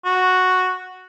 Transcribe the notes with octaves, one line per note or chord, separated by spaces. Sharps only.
F#4